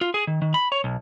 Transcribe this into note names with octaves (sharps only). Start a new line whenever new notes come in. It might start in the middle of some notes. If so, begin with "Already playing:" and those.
F4
G#4
D#3
D#3
B5
C#5
B1